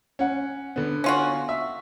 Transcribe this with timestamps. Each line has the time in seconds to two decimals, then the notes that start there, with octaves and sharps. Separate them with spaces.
0.19 C#4 F#5
0.76 D3 B3
1.04 C#4 F4 F#4
1.49 E5